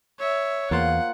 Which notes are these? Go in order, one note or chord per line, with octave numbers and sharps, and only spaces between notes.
C#5 E5
E2 A#3 F4 C5 F#5